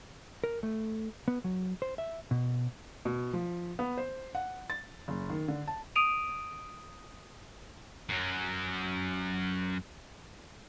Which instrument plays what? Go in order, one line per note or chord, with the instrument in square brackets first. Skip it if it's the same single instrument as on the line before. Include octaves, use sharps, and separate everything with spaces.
[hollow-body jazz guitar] A#4
A3
B3
F#3
C5
E5
B2
[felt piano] B2
F3
B3
C5
F#5
A6
F#1
D#3
D3
A5
[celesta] D#6 D7 D#7 F7
[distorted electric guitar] F#2 F#3